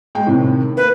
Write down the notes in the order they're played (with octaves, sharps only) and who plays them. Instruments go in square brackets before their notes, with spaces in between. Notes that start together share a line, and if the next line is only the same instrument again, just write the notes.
[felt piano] G#3 G5
A2 C3 D#3
[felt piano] A#3 [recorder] B4